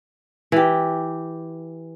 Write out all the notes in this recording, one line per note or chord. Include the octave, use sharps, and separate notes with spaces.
E3 G4